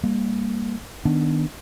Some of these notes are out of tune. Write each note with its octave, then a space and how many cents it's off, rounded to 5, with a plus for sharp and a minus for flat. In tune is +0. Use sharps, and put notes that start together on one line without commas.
G3 +35 A#3 +0
D#3 +0 B3 +0 D4 +0